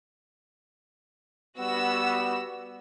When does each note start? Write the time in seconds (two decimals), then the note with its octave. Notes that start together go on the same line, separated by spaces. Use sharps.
1.58 G3 B3 F#4 E6